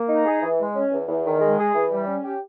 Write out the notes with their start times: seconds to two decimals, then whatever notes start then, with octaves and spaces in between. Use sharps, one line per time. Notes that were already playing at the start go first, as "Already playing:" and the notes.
Already playing: A#3
0.09 D#4
0.25 G#4
0.42 E3
0.59 G#3
0.75 C#4
0.92 E2
1.08 E2
1.24 D#3
1.41 G#3
1.58 G#4
1.75 E3
1.91 G3
2.07 C#4
2.23 G4